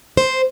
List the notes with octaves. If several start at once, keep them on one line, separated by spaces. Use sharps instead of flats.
C5